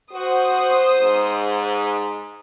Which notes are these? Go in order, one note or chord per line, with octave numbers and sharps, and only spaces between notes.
F#4 C5 D#6
G#2